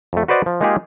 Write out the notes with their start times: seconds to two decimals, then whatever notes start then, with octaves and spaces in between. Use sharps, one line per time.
0.13 F2 A3
0.28 F#4 B4 C5 D5 D#5 F#5
0.46 F3
0.61 G#3 A#3 D#4 F4 G4 G#4